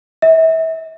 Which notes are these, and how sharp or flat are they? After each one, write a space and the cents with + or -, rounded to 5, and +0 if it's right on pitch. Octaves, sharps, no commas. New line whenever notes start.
E5 -30